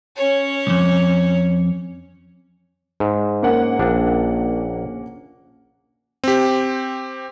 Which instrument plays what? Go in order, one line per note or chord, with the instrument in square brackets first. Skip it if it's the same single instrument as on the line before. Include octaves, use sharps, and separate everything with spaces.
[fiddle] C#4 C#5
[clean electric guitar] C2 F2
[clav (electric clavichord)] G#2
[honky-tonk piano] A#3 C#4 F#5
[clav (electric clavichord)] A#1 D4
[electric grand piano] C4 G4